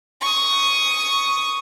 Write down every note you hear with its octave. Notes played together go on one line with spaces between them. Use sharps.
C#6 D#6